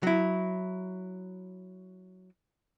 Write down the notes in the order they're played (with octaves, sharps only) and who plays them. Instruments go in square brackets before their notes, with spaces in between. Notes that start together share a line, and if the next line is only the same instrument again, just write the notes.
[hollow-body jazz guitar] F#3 E4